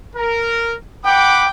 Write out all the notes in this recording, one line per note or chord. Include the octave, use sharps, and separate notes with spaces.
A#4
F#5 G5 B5 D6